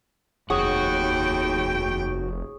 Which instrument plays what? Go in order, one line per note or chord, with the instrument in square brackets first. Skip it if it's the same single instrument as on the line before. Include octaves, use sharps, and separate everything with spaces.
[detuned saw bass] F1 [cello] D#2 G5 [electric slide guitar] F#4 F#5 [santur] G#4 C#5